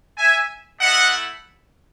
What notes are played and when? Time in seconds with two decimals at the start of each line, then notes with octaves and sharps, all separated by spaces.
0.18 E5 G#5
0.80 A3 E4 D#5 F#5